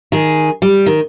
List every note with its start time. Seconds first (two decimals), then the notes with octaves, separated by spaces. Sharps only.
0.12 D#3 G#4
0.62 G3
0.86 D#3